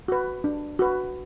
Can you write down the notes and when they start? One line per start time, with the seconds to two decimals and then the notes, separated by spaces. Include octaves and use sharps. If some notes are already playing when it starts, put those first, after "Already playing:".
0.08 F#4 B4
0.44 D4
0.79 F#4 B4